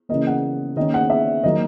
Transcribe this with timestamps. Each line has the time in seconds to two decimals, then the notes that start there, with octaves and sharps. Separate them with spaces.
0.09 C#3 E3 A#3 D#5
0.27 F#5
0.76 D#3 A#3 C#4 D#5
0.94 F#5
1.10 E5
1.44 D#3 F#3 A#3 D#5